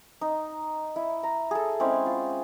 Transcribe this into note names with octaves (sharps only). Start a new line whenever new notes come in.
D#4
E4
A#5
G#4 A4
G#3 C4 C#4 E4
F4